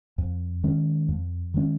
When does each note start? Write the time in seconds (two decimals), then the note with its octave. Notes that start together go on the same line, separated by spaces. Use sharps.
0.18 F2
0.64 D#3 G#3 C#4
1.09 F2
1.54 D#3 G#3 C#4